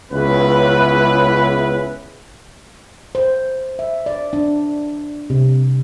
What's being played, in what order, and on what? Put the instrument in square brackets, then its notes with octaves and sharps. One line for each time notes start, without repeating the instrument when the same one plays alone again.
[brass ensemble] C#2 B3 C#4 E4 G#4 B4
[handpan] C5
E5
D5
D4
C3